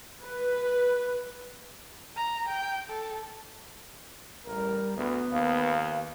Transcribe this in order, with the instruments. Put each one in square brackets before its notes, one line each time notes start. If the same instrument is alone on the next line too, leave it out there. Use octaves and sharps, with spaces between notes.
[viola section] B4
[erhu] A#5
G5
A4
[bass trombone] A1 [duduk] G3 [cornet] A#4
[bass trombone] D2 [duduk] B3 [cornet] B4
[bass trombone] D#2 [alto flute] F5